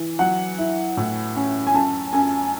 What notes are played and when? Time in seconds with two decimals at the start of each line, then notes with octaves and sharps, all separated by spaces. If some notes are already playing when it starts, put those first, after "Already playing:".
Already playing: E3
0.19 F#3 F#5
0.58 E4
0.97 A2
1.36 C#4
1.67 G#5
1.74 F#2 A5
2.13 F#2 G#5